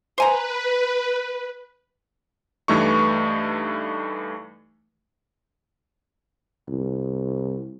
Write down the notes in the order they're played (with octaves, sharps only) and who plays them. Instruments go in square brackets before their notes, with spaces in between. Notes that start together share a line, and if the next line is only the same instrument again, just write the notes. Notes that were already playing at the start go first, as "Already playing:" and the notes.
[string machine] B4 [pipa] C5 G#5 A#5
[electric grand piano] G2 E3 A3 D#4 C#6
[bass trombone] C2